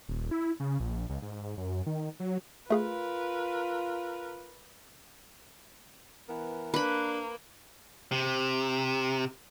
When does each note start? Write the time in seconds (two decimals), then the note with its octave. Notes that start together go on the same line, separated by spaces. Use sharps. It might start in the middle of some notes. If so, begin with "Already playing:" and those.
0.09 D#1
0.31 E4
0.60 C#3
0.80 A#1
1.09 C#2
1.22 G#2
1.58 F#2
1.86 D#3
2.20 F#3
2.70 A3 F4 G#4 A#4 B4 F5
6.28 E3 B3 A#4
6.74 A#3 D4 B4 B5
8.11 C3